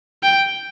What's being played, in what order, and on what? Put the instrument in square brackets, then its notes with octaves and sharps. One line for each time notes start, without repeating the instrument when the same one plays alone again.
[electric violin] G5